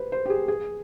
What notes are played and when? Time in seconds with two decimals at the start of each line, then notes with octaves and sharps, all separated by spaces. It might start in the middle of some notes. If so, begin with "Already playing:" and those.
Already playing: B4 C5
0.12 C5
0.26 G4
0.30 G#4
0.48 G#4